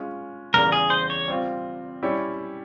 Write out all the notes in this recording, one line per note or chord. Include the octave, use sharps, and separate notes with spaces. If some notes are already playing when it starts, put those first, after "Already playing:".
Already playing: G#3 C#4 F4
E2 C#3 G3 A#4
G#4
C5
C#5
G3 C4 F4
G3 C#4 E4 G4 C#5